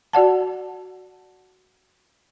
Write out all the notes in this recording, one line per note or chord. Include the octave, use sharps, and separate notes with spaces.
F#4 D5 F#5 A5